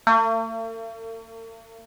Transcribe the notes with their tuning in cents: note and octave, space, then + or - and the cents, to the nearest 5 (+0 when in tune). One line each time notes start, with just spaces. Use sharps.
A3 +45